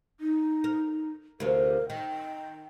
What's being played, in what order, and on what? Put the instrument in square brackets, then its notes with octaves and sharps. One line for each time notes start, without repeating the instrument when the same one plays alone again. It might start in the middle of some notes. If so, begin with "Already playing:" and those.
[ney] D#4
[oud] A#4
[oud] D2 C3 F4 [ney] A#4
[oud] D#3 [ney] G5